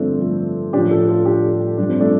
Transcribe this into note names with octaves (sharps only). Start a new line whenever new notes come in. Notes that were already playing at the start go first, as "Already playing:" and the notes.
Already playing: G2 D3 F3 A3 C4 D4
F3 A3
A2 F3 D4 G4
F4 A4
F4 A4
D4 G4
G2 F3 D4
C4
A3 D4